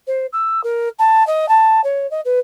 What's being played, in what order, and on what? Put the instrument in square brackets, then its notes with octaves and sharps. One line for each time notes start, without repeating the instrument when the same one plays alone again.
[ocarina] C5
E6
A#4
A5
D#5
A5
C#5
D#5
B4